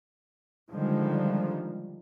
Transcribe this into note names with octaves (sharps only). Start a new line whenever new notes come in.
D3 D#3 F3 G3 G#3